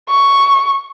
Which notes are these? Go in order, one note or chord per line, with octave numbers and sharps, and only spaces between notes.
C#6